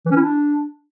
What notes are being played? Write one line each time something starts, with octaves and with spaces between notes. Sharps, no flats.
E3
C#4
E4
D4